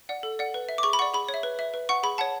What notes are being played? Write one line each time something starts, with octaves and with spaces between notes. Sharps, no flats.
D5 F#5
A4
D5 F#5
B4
E5
D6
G#4 C#6
B5
D5 F#5 C#6
G#4 B5
C#5
E5
B4
E5
B4
F#5 C#6
G#4 B5
C#5 F#5 A5